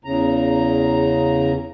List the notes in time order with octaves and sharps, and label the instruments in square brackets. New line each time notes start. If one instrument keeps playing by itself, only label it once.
[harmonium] E2 C#3 A#5